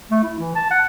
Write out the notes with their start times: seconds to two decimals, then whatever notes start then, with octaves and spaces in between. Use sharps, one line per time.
0.11 A3
0.23 E4
0.39 E3
0.55 A5
0.71 F#5